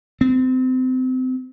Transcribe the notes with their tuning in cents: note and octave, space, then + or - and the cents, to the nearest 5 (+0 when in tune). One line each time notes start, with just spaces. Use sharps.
C4 -30